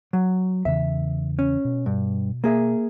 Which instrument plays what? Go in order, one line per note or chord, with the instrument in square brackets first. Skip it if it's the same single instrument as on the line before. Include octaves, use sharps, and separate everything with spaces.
[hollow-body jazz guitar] F#3
[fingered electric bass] E2 C#3 E3 [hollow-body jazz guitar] E5
[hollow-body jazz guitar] C#4
[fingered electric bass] B2
[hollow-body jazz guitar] G2
A#3 G#4 E5